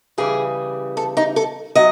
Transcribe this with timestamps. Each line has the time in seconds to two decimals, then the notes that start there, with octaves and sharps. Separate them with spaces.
0.18 C#3 E3 G3 G#4
0.97 A4
1.17 D#4
1.36 A4
1.75 F#3 D#5